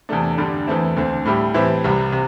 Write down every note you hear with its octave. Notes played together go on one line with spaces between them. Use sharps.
E2 C3 A3 D4
G2 D3 G3 D4 G4
E2 E3 A3 C4 E4
D2 D3 C4
A2 G3 E4 G4
A2 E3 C4 E4 G4
C2 C3 G3
C3